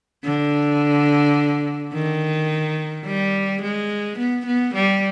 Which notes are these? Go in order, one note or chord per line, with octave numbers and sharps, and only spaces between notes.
D3
D#3
G3
G#3
B3
B3
G3